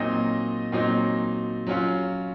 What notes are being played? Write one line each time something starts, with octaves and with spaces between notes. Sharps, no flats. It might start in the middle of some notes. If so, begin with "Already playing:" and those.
Already playing: A#2 F#3 C4 D#4 D#5
A#2 F#3 C4 D#4
F#3 C#4 F4